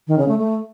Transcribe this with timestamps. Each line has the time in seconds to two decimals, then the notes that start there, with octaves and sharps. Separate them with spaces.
0.08 D#3
0.18 C#3
0.28 A3
0.38 A3